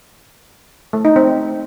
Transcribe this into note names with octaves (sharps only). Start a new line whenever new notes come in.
A3
D#4
C4